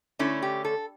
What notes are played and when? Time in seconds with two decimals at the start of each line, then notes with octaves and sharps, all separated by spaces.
0.19 D3 A3 C#4 E4
0.42 G4
0.65 A4